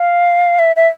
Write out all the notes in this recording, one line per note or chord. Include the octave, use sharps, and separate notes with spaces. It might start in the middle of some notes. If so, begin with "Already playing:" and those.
Already playing: F5
E5
E5